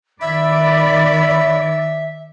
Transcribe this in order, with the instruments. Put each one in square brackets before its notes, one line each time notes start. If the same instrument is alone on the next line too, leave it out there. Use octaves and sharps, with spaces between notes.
[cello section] D#3 D5 [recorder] E5 [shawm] B5